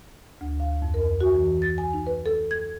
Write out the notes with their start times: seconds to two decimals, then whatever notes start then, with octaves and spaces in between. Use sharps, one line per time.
0.41 D2
0.60 F5
0.82 F2
0.94 A#4
1.21 F#4
1.35 E3
1.62 A6
1.78 G#5
1.94 D#4
2.07 B4
2.26 A4
2.51 G#6